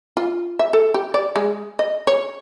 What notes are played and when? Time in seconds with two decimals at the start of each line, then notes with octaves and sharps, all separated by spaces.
0.17 F4
0.59 E5
0.73 A4
0.94 G4
1.14 D5
1.36 G#3
1.79 D#5
2.07 C#5